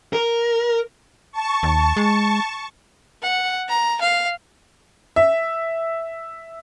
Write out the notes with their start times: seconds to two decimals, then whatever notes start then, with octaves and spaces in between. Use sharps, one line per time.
0.13 A#4
1.32 A5 C#6
1.63 D#2
1.97 G#3
3.23 F#5
3.69 A#5
4.01 F5
5.16 E5